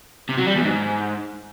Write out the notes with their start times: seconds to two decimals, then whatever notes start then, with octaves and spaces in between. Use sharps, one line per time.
0.29 C3
0.38 F#3
0.47 G3
0.56 E2
0.64 G#2